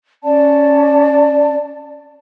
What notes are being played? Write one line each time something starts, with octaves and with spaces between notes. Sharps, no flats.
C#4 D5 A5